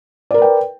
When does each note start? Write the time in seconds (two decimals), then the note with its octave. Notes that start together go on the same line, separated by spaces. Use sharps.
0.31 D5
0.34 A#4
0.38 B4
0.42 G5